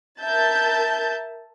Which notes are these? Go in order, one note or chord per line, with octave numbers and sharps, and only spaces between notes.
A#4 E5 A5 G6 A6